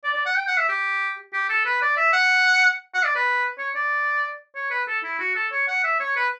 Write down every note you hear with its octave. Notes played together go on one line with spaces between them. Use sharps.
D5
D5
F#5
G5
F#5
E5
G4
G4
A4
B4
D5
E5
F#5
F#5
D5
B4
C#5
D5
C#5
B4
A4
E4
F#4
A4
C#5
F#5
E5
C#5
B4